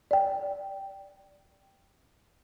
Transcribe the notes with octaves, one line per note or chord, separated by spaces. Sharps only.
D5 G5